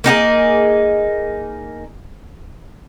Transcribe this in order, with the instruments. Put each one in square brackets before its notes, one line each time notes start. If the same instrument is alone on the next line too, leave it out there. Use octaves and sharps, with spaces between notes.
[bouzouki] A#3 D#4 G4 G#4